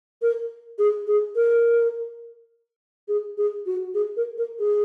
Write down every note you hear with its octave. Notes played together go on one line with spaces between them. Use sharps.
A#4
G#4
G#4
A#4
G#4
G#4
F#4
G#4
A#4
A#4
G#4